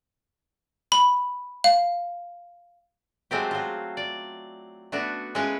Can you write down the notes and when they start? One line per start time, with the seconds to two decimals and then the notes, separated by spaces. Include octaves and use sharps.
0.92 B5
1.64 F5
3.31 F#3 G#3 A3 C4 F4 G4
3.51 F#3 F4
3.97 D5
4.92 A3 B3 D4 F#4
5.35 G#3 C#4 E4 F4 B4 C#5